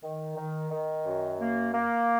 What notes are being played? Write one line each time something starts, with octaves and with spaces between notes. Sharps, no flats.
D#3
D#3
D#3
F#2
A#3
A#3